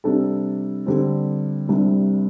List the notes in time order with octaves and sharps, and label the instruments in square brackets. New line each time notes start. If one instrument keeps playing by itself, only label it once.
[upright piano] C3 G3 D4 A4
D3 G3 C4
C2 C3 G3 D4